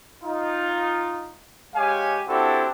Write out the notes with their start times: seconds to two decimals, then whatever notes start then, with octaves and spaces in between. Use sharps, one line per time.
0.23 D#4 F4
1.74 G#3 G4 C#5 F5 G#5
2.28 C4 D4 E4 F#4 G4 A4